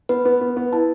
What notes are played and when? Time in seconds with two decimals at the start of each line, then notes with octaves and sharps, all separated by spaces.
0.09 B3 B4
0.25 B3
0.41 B3
0.56 B3
0.72 E4 A5